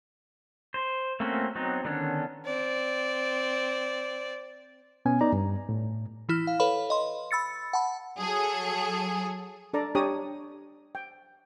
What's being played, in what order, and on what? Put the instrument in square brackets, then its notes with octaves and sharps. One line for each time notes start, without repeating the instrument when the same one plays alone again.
[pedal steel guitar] C5
A3 A#3 C4 C#4 F#4
F#3 B3 C4 D#4
D3 D#3 B3 C#4 D4
[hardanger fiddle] C4 D5
[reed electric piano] B2 B3 C#4 G#5
B3 D#4 D5 A#5
G2
A2
[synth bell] E3 E4 F6
F5
A4 B4 C#5 F5 B5
D#5 C6
B5 E6 A6 C#7
F#5 A5 B5
[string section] F#3 G#4 A4
[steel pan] D4 A4 D5 A#5
D4 G4 C#5 A#5 D#6
G5